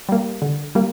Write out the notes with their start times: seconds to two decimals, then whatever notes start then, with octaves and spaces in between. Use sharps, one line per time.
0.09 G3 A#3
0.42 D3
0.75 G3 A#3